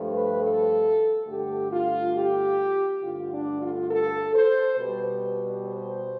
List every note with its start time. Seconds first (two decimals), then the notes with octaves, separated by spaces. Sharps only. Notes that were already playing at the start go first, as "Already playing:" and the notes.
Already playing: G2 F3 A3
0.11 B4
0.40 A4
1.27 G2 D3 A3 G4
1.72 F4
2.16 G4
3.03 G2 D3 A3 F4
3.32 D4
3.61 F4
3.90 A4
4.34 C5
4.77 B2 G3 B4
5.65 C5